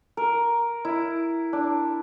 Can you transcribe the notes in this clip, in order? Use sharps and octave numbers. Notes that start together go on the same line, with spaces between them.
A#4
E4
D4